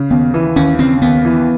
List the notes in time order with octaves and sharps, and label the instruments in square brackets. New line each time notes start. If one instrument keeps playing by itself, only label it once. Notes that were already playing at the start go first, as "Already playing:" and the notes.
Already playing: [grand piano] C#3
[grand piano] D#2 [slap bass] B3
[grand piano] E3
[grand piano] D#2 [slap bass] C#4
[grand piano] C#3 [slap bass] C4
[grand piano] D#2 [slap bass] B3
[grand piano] E3